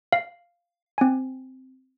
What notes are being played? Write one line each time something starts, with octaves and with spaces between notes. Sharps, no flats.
F5
C4 G#5